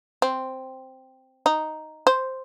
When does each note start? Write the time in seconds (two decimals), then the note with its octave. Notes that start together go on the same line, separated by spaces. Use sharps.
0.22 C4
1.46 D#4
2.07 C5